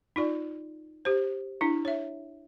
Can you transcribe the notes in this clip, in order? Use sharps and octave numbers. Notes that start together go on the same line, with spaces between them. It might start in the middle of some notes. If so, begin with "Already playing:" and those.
D#4 F4 D5
G4 C5
D4 E4
C#5 E5